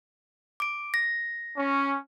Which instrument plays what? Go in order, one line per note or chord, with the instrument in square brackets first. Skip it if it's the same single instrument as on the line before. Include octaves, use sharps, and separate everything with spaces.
[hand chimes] D6 D7
A#6
[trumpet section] C#4